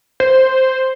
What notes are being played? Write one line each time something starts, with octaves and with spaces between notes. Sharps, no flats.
C5